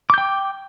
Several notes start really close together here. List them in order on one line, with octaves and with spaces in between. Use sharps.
D6 G6 G5